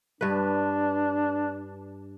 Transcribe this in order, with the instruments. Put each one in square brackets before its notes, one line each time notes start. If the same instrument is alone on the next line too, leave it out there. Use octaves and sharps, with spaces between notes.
[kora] G2 B4 [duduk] D4